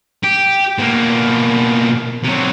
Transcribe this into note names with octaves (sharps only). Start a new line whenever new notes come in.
G4
B2 A#3
C3 F#3